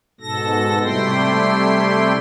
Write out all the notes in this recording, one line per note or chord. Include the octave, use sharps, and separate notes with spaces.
G#2 B2 A4 A#6
C3 G3 A3 E4 G5 C6